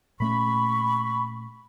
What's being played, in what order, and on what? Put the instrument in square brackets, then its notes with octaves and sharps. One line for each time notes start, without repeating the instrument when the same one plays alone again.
[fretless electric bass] A#2 A3 C#4 [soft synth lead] B5 [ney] C#6